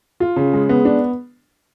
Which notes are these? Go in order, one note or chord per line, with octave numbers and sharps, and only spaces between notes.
F4
C#3
G#3
B3
D4